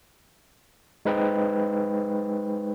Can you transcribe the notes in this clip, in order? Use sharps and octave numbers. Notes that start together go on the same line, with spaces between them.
G#3 D#4 B4 C5 D#5 G5